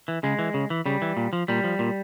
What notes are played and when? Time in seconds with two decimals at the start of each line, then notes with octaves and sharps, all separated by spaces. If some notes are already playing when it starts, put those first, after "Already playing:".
0.08 E3
0.23 C#3 G#3
0.39 E3
0.54 C#3
0.70 E3
0.86 C#3 G3
1.02 E3
1.17 A#2
1.33 F3
1.48 A#2 G3
1.64 F3
1.79 A#2